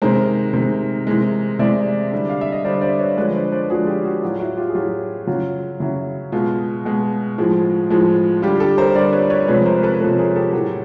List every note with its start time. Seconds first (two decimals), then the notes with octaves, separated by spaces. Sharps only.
0.02 C3 D#3 G#3 A#4 C5
0.54 C3 D#3 G#3
1.07 C3 E3 G#3
1.59 C3 E3 G#3 D5 E5
2.12 D3 G3
2.29 F5
2.41 E5
2.52 D#5
2.64 D3 G3 C5 D5
2.81 C5 D5
2.99 B4 C#5
3.17 D3 F3 G#3 B4 C#5
3.35 C5 D5
3.52 C5 D5
3.69 D3 F3 G#3 F#4 G#4
3.87 F4 G4
4.04 F#4 G#4
4.22 A2 F#3 F4
4.40 E4 F#4
4.57 F4 G4
4.69 G#4
4.75 A2 F#3 F4 G4
5.27 C#3 F#3 F4
5.80 C#3 F#3 E4
6.32 B2 G#3 F4
6.85 B2 G#3
7.38 A2 F3 G#3
7.90 A2 F3 G#3
8.42 D3 G3 F4 G4
8.60 G4 A4
8.78 A#4 C5
8.95 D3 G3 C5 D5
9.12 B4 C#5
9.30 B4 C#5
9.48 C3 F3 G#3 B4 C#5
9.65 A#4 C5
9.83 A4 B4
10.00 C3 F3 G#3 A4 B4
10.19 G#4 A#4
10.36 G4 A4
10.53 A2 F#3